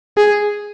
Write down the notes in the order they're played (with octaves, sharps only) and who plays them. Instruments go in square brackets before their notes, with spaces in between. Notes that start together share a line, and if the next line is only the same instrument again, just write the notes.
[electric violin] G#4